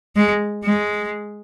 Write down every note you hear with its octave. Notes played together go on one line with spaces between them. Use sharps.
G#3
G#3